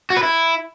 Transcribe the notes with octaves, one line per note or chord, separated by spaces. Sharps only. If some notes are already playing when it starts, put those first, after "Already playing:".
F#4
B4
E4